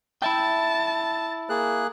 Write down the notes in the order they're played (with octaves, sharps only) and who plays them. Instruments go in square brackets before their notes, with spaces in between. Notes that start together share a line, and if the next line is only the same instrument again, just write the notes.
[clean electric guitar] E4 E5 G5 [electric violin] A5
[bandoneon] A#3 G#4 F#6